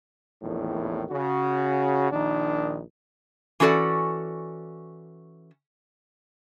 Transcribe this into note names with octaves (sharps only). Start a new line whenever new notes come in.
A#1 E2 A2 D#3
C#3 F#4
A#1 D#3 D4 D#4
E3 C#4 F#4 A4 D5